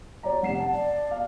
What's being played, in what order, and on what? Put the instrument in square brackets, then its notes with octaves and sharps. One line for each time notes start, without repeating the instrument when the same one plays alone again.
[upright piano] C#5 D5 A#5
[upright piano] F1 C7 E7 [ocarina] F#5
[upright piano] A5
[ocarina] D5
[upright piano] F5